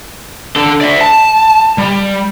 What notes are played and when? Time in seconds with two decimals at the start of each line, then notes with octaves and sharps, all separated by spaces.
0.56 D4 A4
0.81 D5 E5
1.01 A5
1.78 G3